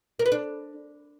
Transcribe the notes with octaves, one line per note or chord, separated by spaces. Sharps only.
A#4
B4
D4